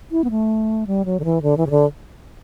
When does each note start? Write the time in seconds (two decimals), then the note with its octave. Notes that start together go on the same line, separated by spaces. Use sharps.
0.11 E4
0.24 B3
0.30 A3
0.87 G3
1.05 F#3
1.20 D3
1.25 E3
1.42 D3
1.57 E3
1.67 C#3
1.71 D3